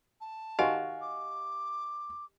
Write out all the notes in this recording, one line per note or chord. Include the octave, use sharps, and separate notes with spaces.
A5
D#3 F#4 G4 D#5 F5 G#5 C6
D6